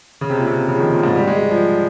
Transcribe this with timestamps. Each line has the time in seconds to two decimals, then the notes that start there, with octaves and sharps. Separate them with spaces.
0.21 C#3
0.30 C3
0.38 A#2
0.46 C3
0.68 C#3
0.75 F3
0.80 D#3
0.92 A#2
1.03 G#2
1.16 G3
1.27 G#3
1.39 G3
1.50 F3